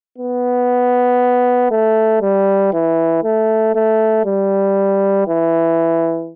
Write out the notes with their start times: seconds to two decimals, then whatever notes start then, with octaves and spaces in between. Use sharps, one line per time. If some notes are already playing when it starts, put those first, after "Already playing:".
0.18 B3
1.71 A3
2.21 G3
2.73 E3
3.24 A3
3.75 A3
4.26 G3
5.28 E3